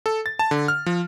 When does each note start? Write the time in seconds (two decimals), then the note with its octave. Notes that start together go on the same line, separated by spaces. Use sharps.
0.06 A4
0.26 A6
0.39 A5
0.51 D3
0.68 F6
0.86 F3